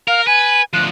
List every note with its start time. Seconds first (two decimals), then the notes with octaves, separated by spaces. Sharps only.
0.08 A#4 F5
0.27 B4 G#5
0.73 D2 F3 F#6